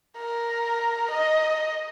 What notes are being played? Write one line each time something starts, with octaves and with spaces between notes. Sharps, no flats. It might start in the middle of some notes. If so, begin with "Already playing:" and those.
A#4
D#5